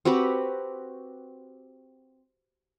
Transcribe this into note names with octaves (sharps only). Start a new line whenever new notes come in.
C4 F#4 G4 B4